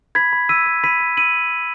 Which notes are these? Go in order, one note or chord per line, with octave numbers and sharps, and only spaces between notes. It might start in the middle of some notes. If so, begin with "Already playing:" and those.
B5 G#6 B6
B5
E6 B6 D#7
E6
B5 B6 D#7
B5
E6 D#7 F#7